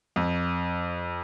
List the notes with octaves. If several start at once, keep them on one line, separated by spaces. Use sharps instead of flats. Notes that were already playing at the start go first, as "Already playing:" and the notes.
F2